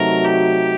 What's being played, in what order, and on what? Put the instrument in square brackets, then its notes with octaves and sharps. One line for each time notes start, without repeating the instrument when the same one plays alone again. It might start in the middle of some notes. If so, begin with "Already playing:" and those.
Already playing: [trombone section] C3 F#3 A3 D#4 F#4 [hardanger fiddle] A#4
[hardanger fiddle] G4